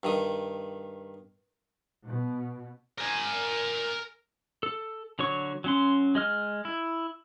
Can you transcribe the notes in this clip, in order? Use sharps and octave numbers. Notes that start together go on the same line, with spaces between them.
G2 D#3 D#6
B2
A#4 G#5
A4
D3 F#3 C#5 C#6
F#3 C#4 C6
G#3 D#5 F6
E4